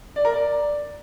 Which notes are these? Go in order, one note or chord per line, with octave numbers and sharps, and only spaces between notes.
D5
A#4
D5